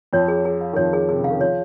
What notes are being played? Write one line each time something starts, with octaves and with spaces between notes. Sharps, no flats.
F2 F3 C#5
G#4
G#4
F5
D#3
F2 F3 C#5
G#4
C3 G#4
C#3 F5
D#3
F3 C#5